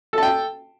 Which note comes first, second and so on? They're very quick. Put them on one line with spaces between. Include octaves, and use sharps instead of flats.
A4 A5 G5